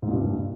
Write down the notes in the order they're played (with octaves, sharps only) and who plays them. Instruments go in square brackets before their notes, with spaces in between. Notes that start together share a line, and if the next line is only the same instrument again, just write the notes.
[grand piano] G#2
A#2
G2